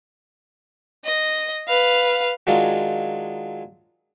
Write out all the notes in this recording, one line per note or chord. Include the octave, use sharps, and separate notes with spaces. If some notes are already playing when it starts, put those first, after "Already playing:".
D#5
B4 F5
D#3 F#3 G#3 D4 F4